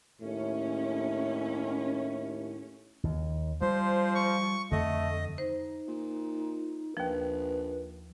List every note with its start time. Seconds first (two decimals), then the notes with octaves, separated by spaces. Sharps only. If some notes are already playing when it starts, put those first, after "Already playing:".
0.21 D#2 A2 C#4
3.04 D#2
3.62 F3 G3 C5
4.15 C#6
4.72 F2 D3 A3 D#5
5.38 D#4 C5
5.88 A#2
6.97 A#1 D#2 F3 B4